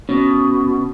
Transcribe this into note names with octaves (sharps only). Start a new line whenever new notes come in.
B2 C#4